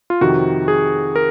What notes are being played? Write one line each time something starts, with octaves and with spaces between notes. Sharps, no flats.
F4
F2 C3 D#3 F#4
G#4
A#4